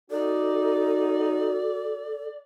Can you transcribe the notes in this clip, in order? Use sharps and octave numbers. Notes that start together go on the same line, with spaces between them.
D#4 F#4 A4 D5